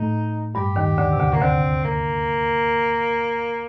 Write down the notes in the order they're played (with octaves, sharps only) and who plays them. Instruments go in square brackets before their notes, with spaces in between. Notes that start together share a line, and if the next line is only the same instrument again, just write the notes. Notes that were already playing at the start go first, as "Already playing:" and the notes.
Already playing: [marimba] A2 A3 [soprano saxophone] D#4
[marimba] G2 G3 [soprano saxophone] G4
[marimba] D#2 D#3
D2 D3
C3
D2 D3
[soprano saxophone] A#3
[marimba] D2 D3 [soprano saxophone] C4
[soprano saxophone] A#3